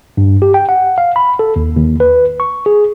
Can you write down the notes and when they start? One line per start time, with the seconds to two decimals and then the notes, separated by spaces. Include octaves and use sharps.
0.17 G2
0.42 G4
0.54 G5
0.69 F#5
0.98 F5
1.16 B5
1.39 A4
1.56 D#2
1.76 D#2
2.00 B4
2.40 C#6
2.66 G#4